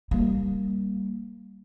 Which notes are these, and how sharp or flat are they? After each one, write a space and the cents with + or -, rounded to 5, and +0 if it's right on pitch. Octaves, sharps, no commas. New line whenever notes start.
G3 +0 A#3 +0